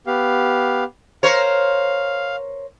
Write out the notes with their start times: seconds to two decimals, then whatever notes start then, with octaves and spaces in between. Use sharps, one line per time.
0.07 B3 G4 F5
1.23 A#4 C5 C#5 F5